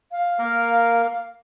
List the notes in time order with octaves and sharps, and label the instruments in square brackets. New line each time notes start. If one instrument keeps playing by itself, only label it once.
[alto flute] F5
[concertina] A#3 A#4